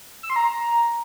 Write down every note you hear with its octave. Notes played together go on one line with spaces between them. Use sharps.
E6
C6
A#5